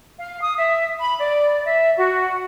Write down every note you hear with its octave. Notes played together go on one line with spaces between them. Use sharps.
F5
D#6
E5
B5
D5
E5
F#4